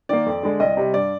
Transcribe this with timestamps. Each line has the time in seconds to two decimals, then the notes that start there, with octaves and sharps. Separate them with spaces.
0.09 D#3 A#3 D5
0.26 F2
0.43 D3 G#3
0.60 C2 D#5
0.77 C3 G3
0.94 G2 D5